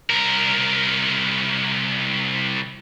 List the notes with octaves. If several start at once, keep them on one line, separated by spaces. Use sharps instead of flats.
C2 A#4